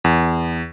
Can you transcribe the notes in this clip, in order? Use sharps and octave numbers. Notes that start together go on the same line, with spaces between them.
E2